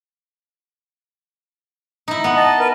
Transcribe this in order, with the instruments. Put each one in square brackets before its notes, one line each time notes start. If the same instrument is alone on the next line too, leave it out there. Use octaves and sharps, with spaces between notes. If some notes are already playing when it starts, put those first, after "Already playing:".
[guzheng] D#4 E4
B3
[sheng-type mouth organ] D#5 A5
A#4 B4